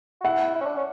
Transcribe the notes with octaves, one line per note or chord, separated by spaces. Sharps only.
F#4
E4 F#5
E4
C#4
D4
C#4